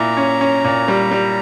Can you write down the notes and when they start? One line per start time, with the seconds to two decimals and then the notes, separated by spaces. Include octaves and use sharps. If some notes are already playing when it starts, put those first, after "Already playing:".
Already playing: A#2 E4 A#5
0.17 C#4
0.41 C#4
0.64 A#2
0.88 G3
1.11 G3